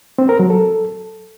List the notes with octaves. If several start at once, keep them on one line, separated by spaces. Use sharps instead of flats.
C4
A#4
F#3
A4